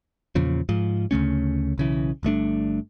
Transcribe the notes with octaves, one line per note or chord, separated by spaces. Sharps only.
E2 A#2 C#3 F3
G#2 F3
D2 C#3 A3 C#4
B1 C#3 E3
G1 G2 A3 D4